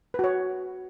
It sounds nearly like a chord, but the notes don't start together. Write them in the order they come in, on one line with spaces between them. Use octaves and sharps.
B4 F#4 C#5